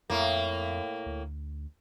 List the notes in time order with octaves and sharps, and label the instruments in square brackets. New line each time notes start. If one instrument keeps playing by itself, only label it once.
[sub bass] F2 [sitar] A2 A#3
[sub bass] D2